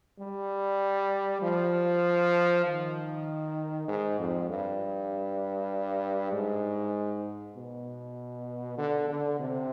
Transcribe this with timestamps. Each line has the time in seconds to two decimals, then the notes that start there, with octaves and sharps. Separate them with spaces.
0.20 G3
1.42 F3
2.66 D#3
3.88 G#2
4.19 F2
4.49 G2
6.33 G#2
7.56 B2
8.78 D3
9.08 D3
9.40 C3